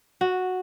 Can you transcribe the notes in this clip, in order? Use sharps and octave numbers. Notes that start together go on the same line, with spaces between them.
F#4